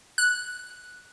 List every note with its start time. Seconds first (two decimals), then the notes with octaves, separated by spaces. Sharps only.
0.18 F#6